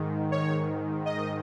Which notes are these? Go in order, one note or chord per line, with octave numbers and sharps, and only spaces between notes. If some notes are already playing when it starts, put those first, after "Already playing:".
Already playing: G#2 D#3
C#5
D#5